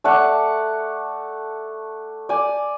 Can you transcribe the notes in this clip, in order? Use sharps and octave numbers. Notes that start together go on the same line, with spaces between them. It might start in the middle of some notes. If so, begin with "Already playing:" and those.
A3 A4 D5 F#5
D5 G#5